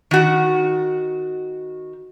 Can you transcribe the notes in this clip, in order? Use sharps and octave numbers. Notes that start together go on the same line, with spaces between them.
D#3 F#4